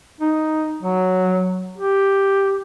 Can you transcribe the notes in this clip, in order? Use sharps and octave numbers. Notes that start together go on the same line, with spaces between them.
D#4
F#3
G4